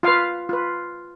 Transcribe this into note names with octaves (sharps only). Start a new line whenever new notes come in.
F4 B4 F5
F4 B4